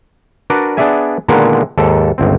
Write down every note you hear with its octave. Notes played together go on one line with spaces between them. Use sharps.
D4 F#4 A#4 B4 D5
B3 D4 G#4 D5 E5 G#5
A#2 D3 D#3 G#3 A#3 B3
D#2 G#2 A4 A5
G1 C#2 C4